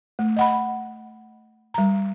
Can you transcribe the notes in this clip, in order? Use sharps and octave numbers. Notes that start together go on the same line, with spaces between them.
A3
D#5 F#5 B5
G3 A#5